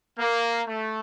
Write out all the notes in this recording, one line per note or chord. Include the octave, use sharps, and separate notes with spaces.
A#3
A3